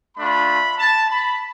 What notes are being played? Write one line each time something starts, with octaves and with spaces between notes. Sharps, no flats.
A3 D4 F4 B5
A5
B5